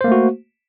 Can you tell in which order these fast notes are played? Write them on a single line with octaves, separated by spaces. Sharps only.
C5 A#3 A3 F#4